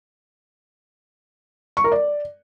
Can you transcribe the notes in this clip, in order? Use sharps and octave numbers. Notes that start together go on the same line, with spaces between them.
C#6
A#4
D5